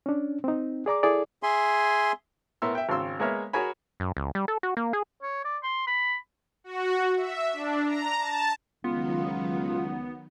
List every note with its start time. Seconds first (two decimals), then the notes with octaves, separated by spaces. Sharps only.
0.06 C#4 D4
0.44 C4 D#4
0.86 G#4 D5 A#5 D6
1.03 E4 G#4 A4 D5
1.43 G#4 E5 G#5 C6
2.62 A2 B3 A#4 E5 C6 E6
2.75 E5 G5
2.89 G#1 C#3 C6 E6
3.20 G#3 A#3 B3 C#5 E5 F6
3.53 F#4 G#4 A#4 C#5 G#5 B5
4.00 F#2
4.17 C#2
4.35 G3
4.48 A4
4.63 F#4
4.77 A#3
4.93 G#4
5.22 C#5
5.44 D5
5.63 C6
5.87 B5
6.64 F#4
7.17 E5
7.53 D4
7.86 A#5
8.18 A5
8.84 C#2 D#3 F#3 B3 D#4 F4